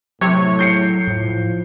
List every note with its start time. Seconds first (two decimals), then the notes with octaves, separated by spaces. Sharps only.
0.21 A2 C3 F#3 C#5
0.59 G6 C7 C#7
1.08 A2 F3